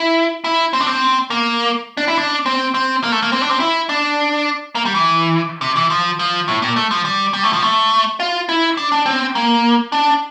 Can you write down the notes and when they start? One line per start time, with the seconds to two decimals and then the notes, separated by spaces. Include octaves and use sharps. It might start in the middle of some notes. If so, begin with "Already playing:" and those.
Already playing: E4
0.44 E4
0.73 C4
0.80 D4
0.87 C4
1.30 A#3
1.97 D4
2.08 E4
2.17 D4
2.46 C4
2.74 C4
3.03 A#3
3.12 A3
3.22 A#3
3.32 C4
3.42 D4
3.50 C4
3.60 E4
3.89 D4
4.75 A#3
4.85 G3
4.94 E3
5.61 C3
5.76 E3
5.90 F3
6.19 F3
6.48 A2
6.62 A#2
6.76 A3
6.91 F3
7.05 G3
7.33 G3
7.43 A3
7.53 F3
7.62 A3
8.20 F4
8.49 E4
8.77 D4
8.92 D4
9.06 C4
9.35 A#3
9.92 D4